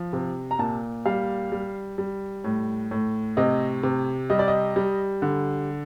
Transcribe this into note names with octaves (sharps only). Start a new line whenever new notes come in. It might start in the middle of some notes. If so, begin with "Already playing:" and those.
Already playing: F3
C3
A#5
A#2 A5
G3 F5
G3
G3
A2
A2
C3 D#5
C3
G3 D#5
D5
D#5
G3
D3